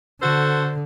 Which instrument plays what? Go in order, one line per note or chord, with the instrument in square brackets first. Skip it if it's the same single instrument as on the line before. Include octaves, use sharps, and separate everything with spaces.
[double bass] D3 [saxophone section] F#4 A4 C5